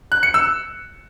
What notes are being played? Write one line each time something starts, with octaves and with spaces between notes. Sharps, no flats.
F#6
C#7
E6